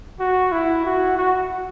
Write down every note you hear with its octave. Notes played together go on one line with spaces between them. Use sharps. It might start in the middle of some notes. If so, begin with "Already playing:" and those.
F#4
E4
F#4
F#4